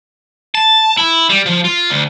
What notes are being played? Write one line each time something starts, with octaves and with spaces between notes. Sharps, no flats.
A5
E4
G3
F3
F4
D2